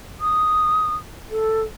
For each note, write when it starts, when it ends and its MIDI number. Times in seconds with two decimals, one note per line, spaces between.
0.20 0.96 87
1.30 1.62 69